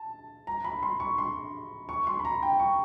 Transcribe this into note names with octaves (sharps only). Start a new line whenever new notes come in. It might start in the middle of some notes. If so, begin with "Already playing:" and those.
Already playing: A5
A#5
B5
C6
C#6
C6
C#6
C6
B5
A#5
G5
C#6